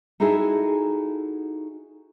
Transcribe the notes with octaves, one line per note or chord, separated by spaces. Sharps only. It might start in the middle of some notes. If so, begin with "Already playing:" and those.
D#4 E4 F#4 G#4 A4 E5